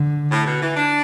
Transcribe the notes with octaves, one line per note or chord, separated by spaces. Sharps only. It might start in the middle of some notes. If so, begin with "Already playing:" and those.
Already playing: D3
A2
B2
E3
D4